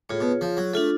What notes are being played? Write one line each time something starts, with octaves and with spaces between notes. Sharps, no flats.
A2 F4 G#4 C#5
B2
F3
F#3
A3 D4 F4 A4